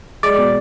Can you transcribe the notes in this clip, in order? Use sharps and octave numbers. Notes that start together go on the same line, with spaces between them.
G#3 D5
B2